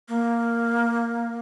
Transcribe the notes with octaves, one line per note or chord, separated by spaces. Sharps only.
A#3